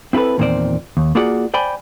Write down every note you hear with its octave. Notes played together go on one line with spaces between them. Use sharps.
C4 E4 F4 A4 B4
E2 A#2 D#3 C4 C5 D5
D#2
A#3 F4 F#4 G#4 D5 F#5
C5 D5 G5 G#5 B5